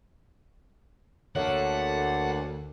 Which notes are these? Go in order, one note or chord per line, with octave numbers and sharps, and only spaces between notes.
D2 A3 A#3 C#5 F#5